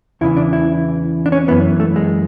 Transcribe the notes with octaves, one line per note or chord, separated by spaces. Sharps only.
E2 C#3 E3 E4
D4
E4
D4
C#4
F#2 E3 B3
A3
G#3